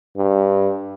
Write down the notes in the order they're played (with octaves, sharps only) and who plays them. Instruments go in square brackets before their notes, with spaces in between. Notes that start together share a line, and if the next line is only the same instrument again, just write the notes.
[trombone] G2